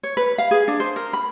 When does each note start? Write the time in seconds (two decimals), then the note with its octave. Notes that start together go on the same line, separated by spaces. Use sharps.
0.03 C#5
0.17 B4
0.38 F5
0.51 G#4
0.68 D4
0.80 C5
0.96 A#4
1.13 B5